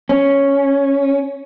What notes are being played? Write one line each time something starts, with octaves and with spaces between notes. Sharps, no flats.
C#4